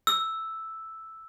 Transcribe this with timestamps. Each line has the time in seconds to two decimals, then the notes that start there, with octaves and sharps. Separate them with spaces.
0.07 E6